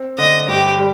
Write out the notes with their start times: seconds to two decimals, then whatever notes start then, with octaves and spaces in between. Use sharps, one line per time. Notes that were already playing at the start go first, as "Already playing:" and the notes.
Already playing: C4
0.18 D3 D#5
0.48 G2 G4
0.78 G3